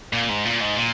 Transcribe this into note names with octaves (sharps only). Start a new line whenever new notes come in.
A#2
G#2
A#2
G#2
A#2